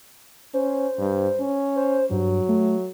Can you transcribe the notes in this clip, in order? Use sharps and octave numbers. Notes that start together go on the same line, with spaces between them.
C#4 C5
G2
C#4
C5
G2 F#3
A3